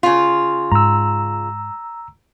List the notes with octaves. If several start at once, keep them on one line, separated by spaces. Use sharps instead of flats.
C#3 F4
G#2 A#5 E6